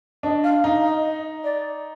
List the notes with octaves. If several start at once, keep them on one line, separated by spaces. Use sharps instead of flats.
D4 D#5
F5
D#4 F5
D#5
D#5
D5